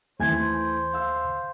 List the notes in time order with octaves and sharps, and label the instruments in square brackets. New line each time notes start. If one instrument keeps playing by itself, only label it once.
[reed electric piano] D#2 G#5 G#6 [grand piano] E3 A3 [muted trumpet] C5
[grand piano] F5 E6